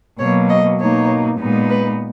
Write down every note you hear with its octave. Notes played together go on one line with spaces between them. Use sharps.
B2 F#3 A#3 C#5
D#5
B2 A#3 D#4 C#5
A#2 G#3 B3 D#4
B4